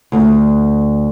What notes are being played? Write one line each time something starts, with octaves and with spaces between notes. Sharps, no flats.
D2